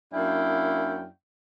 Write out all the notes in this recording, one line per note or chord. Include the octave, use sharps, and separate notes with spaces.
F#2 A#3 D4 E4 F5 G5